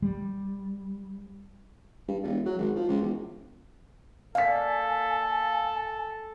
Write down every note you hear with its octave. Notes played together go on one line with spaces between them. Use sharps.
G3
G2
E1
F#3
G#1
F3
C#2
E1
A#3 A4 D5 F5 G#5 B6